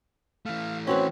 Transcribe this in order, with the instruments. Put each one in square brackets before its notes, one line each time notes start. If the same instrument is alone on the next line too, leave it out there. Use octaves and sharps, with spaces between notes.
[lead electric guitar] E3 A3 [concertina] F5
[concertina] C4 [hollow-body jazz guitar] C#4 F#4 B4 [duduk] C#5